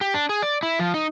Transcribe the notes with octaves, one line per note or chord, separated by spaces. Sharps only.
G4
D4
G#4
D5
E4
F3
D#4